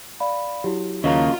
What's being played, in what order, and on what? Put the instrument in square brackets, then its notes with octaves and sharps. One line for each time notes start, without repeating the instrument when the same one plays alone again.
[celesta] D5 F5 B5
[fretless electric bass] F#3 [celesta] E4 G4
[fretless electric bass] D#2 [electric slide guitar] C#3 A#3 [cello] F4 [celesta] D#5 F5 A#5